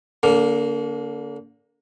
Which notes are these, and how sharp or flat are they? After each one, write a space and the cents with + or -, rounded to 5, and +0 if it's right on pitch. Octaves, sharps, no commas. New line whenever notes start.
D3 -35 A#3 +0